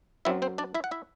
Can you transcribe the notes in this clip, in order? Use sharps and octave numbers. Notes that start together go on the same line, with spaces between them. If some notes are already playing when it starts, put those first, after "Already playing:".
F#2 F#3 C4 E4 E5
C4 C5
D4 D5
E4 E5
F#5
E4 E5